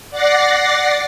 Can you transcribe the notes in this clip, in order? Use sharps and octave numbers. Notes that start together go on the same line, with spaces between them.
D5 F#5 D6 A6 A#6 C7